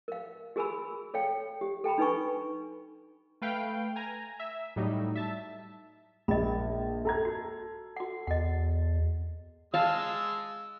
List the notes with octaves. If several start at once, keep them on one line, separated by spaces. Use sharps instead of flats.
A#4 F5
F#4 G#4 A#4 G#5 B5 E6
A4 C#5 F5 G5
G4
A4 G5 A#5 B5
D4 D#4 B4 G#5 C#6
A3 B4 F5 G5
G#5 A#5
E5
A2 F#3 G3 D#4
E5 A5
A#1 D#5 B5
A4 A#5 G#6
F#4
F#4 F#5
E2 D#5 F#5
G#3 F5 A5 E6